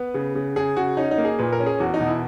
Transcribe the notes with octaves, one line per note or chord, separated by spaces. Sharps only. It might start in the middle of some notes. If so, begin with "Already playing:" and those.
Already playing: B3 B4
C#3
C#3
C#3 G#4
C#3 F#4
C#4 D#4
D#4
A#3
G#4
A#2 B4
A#4
C#4
G#4
E2 F#4
D#4
B2
E4